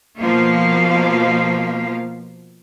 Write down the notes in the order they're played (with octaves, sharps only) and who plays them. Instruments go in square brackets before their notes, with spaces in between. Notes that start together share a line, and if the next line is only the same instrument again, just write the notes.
[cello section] B2 F3 A#3 F5